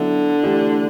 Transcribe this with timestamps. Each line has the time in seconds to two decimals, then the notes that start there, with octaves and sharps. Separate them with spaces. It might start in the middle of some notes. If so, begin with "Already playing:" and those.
Already playing: D3 F#3 B3 E4
0.43 E3 A3 D4 G4